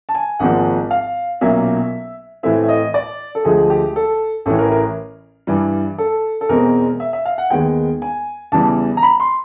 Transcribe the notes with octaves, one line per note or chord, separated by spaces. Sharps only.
A5
G#5
G#1 G#2 F3 A#3 F#5
F5
B1 A#2 F#3 A#3 C#4 E5
A2 E3 A3 C4 E5
E5
D#5
D5
A4
D2 D3 F3 G#3 G#4
G4
A4
A1 A2 E3 A4
A#4
A#4
G2 E3 G3
A4
A4
E2 B2 G#3 C4 A#4
E5
E5
F5
F#5
D#2 D#3 G#3 B3 G5
G#5
E2 C#3 E3 G3 A5
A#5
B5
C6